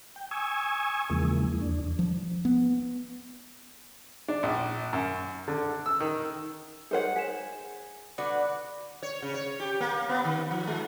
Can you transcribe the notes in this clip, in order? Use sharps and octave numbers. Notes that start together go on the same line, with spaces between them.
G5
G#5 C#6 D#6 E6 G#6
E2 C#3 E3 F3 G#3 A#3
E2 D4
F3
B3
D4
A#1
F#2
D3
E6
D#3
D#4 G#4 A#4 C5 C#5 F#5
G#4 B6 E7
D3 F#4 B4 D5 D#6
C#5
C#3
C#5
G4
A#3
B3
D#3
F3
G#3